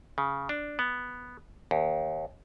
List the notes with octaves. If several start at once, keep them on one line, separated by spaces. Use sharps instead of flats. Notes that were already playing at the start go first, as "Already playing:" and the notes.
C#3
D4
B3
D#2